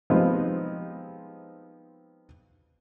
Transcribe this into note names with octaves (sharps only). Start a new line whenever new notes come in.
F3 G3 G#3 B3 C4 D#4